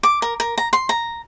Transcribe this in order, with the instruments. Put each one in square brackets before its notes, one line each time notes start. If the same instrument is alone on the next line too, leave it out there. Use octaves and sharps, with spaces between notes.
[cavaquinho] D6
A#4
A#4
A#5
C6
A#5